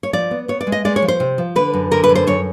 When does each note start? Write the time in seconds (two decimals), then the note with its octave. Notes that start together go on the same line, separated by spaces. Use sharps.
0.03 C#5
0.13 F3 D5
0.31 B3
0.48 B3 C#5
0.61 D5
0.67 G#3
0.72 D#5
0.85 G#3 D5
0.96 C#5
1.02 F3
1.08 C5
1.20 C3
1.38 F3
1.56 D3 B4
1.74 F#2
1.91 D3 A#4
2.04 B4
2.09 F#2
2.15 C5
2.27 F#2 C#5